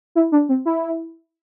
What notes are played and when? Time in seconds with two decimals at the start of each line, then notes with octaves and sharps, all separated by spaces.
0.15 E4
0.32 D4
0.49 C4
0.66 E4